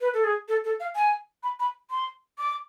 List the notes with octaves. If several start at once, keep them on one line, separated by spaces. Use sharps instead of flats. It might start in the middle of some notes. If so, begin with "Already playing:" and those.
B4
A4
G#4
A4
A4
F5
G#5
B5
B5
C6
D6